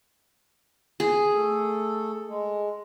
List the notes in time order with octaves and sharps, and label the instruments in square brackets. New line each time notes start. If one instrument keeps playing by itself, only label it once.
[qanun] G#4
[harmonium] A3 A4
G#3